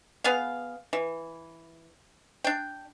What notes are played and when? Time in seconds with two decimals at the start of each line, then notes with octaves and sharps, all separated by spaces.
0.24 B3 G#4 F5
0.93 E3
2.44 D4 G5